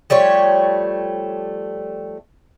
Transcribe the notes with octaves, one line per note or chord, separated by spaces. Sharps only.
F3 G3 A3 C#5